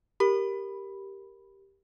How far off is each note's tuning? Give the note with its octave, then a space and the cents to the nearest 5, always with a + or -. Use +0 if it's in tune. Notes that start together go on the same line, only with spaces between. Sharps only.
G4 +0 A#4 +0 B5 +0